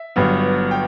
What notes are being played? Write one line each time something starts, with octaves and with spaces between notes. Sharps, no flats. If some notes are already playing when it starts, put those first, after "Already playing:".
Already playing: E5
G1 G2 F#3 B3
G5